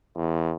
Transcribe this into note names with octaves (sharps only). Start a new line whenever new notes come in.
E2